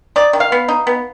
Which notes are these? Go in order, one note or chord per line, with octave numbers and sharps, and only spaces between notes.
D#4 D5
D#3
F5
B3
D#4
B3